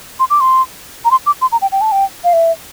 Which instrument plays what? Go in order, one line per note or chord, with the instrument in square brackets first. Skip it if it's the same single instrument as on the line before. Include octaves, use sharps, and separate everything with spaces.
[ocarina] C6
D6
C6
A#5
C6
D6
C6
A#5
G5
G5
A5
G5
F5
E5